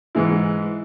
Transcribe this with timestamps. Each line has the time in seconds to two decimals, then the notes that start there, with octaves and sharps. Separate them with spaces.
0.15 G#2 E3 G#3 E4